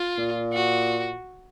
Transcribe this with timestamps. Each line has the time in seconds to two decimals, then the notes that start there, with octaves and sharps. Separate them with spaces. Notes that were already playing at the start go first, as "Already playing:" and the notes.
Already playing: F4
0.18 A#2
0.53 F#4